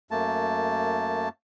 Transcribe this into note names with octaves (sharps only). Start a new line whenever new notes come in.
F#2 A3 A#3 A5